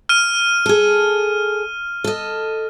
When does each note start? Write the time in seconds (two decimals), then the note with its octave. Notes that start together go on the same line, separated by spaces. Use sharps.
0.09 F6 D#7
0.66 G#4 A4
2.04 A4 D#5